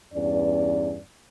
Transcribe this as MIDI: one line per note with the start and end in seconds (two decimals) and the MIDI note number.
0.14 0.98 40
0.14 0.98 43
0.14 0.98 61
0.14 0.98 74